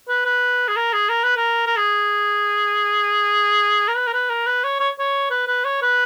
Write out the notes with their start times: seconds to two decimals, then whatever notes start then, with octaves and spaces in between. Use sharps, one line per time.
0.09 B4
0.25 B4
0.68 G#4
0.76 A#4
0.93 G#4
1.09 A#4
1.24 B4
1.37 A#4
1.66 A#4
1.77 G#4
3.88 A#4
3.96 B4
4.07 A#4
4.13 B4
4.30 A#4
4.46 B4
4.64 C#5
4.80 C#5
4.99 C#5
5.30 B4
5.48 B4
5.65 C#5
5.82 B4